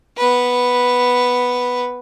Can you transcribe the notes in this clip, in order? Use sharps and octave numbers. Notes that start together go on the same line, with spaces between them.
B3 B4